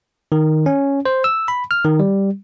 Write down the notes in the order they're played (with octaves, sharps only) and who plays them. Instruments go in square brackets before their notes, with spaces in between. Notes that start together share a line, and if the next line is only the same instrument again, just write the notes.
[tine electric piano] D#3
C#4
C5
E6
B5
F6
D#3
G3